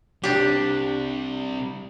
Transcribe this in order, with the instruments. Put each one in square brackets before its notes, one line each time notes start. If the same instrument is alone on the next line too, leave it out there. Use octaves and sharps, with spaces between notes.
[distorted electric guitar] C3 G3 [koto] D4 G4